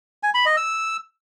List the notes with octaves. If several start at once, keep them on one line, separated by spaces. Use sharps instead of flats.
G#5
B5
D#5
E6